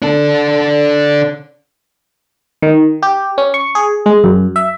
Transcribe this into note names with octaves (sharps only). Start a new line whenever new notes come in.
D4 A4
D#3
G4
C#4
C#6
G#4
G#3
F#2
E5